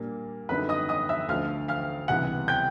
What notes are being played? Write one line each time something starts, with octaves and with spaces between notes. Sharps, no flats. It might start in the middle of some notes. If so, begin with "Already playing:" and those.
Already playing: A#2 G3 A#3 D4
F#2 D3 G3 B3 D#4 B4 B5
D#5 D#6
D#5 D#6
E5 E6
D2 D3 F3 F5 F6
F5 F6
C#2 C3 E3 G3 B3 F#5 F#6
G5 G6